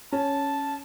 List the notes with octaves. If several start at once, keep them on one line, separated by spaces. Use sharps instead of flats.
C#4 A5